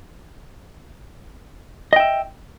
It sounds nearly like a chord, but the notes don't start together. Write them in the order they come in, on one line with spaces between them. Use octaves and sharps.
D#5 G5 E5